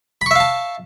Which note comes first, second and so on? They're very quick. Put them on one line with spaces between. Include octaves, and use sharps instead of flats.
B5 C#6 E5 F5 A5